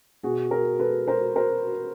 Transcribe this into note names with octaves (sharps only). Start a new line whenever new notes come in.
B2 F#4 G#4
G#4 A#4
A4 B4
A#4 C5
A#4 C5